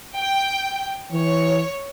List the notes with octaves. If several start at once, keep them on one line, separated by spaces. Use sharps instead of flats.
G5
E3 C#5